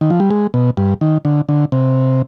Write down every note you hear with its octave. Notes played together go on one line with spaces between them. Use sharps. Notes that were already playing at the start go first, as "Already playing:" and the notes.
D#3
F3
G3
G#3
B2
G2
D#3
D3
D3
C3